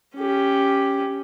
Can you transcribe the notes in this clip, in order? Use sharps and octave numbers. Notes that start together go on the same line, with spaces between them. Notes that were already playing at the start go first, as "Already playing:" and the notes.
C#4 G4